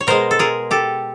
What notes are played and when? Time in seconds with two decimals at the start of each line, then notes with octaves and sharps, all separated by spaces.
0.01 C#5
0.07 B2 G#3 A#4 C5
0.31 A4
0.39 G#4 A#4
0.71 G4 A4